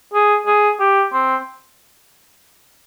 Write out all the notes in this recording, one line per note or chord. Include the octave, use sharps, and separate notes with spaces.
G#4
G#4
G4
C4